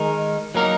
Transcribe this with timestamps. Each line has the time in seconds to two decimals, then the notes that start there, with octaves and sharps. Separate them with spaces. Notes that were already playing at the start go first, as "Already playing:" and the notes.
Already playing: D#3 G#3 D#4 A#4
0.55 F#3 A#3 D#4 A#4